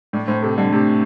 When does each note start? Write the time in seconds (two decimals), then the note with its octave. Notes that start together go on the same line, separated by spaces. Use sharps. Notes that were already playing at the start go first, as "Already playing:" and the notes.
0.13 A2 D5
0.27 A2 C5
0.42 C3 A4
0.57 D3 G3
0.72 C3 A3